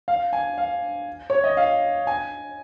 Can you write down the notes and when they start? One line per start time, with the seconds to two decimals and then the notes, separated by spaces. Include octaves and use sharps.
0.08 F5
0.33 G#5
0.58 F5
1.30 C#5
1.44 D#5
1.57 F5
2.07 G#5